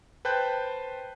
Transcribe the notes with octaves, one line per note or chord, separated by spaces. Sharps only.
B4 C5 G5 A5 F#6 G6